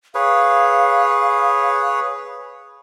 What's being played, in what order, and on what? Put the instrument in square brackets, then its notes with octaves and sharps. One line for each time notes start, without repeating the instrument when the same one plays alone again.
[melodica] G#4 B4 C#5 [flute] F5